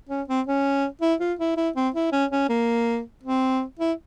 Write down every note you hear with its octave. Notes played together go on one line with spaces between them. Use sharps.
C#4
C4
C#4
E4
F4
E4
E4
C4
E4
C#4
C#4
A#3
C4
E4